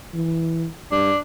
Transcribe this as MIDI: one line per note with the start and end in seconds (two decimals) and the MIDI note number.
0.14 0.67 52
0.92 1.11 43
0.92 1.18 62